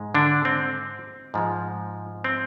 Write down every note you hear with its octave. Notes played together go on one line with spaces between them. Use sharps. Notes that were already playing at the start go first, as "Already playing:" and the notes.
Already playing: G#2 G#3
D3 D4
C4
G#2 F3 G#3
C4